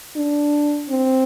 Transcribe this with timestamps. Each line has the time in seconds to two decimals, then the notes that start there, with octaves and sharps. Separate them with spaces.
0.16 D4
0.90 C4